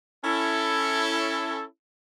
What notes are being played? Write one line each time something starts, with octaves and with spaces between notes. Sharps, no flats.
C#4 E4 A4